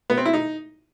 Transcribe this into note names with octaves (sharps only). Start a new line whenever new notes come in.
B3
C4
E4
D#4